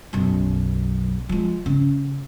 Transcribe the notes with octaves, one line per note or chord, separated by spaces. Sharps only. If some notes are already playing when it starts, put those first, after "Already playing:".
B1 F#2
F3 G#3
C#3